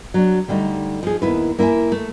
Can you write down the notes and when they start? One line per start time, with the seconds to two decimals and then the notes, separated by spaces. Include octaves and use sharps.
0.14 F#3 D4
0.48 D3 G3 A3 D#4
1.03 F3 G#4
1.22 D#2 B3 E4 B4
1.59 A#3 E4 F4 E5 G#5
1.92 A3